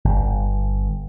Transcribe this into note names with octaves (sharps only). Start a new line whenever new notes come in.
G1